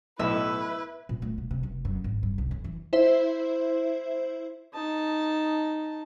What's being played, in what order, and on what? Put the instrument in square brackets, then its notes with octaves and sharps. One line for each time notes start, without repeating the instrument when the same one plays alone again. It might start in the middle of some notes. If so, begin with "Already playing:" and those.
[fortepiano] B1 A2 [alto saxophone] E4 [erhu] B4 [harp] E5
[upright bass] A#2
A3
B2
C3
F1
F#2
G#1
G2
C2
F2
E3
[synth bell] E4 C5 E5
[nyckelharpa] D#4 A5